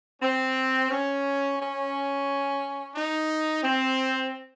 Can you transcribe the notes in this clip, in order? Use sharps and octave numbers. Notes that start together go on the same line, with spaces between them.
C4
C#4
C#4
D#4
C4